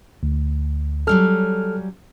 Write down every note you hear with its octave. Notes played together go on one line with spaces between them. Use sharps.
D2
F#3 G3 C#4 A4 F6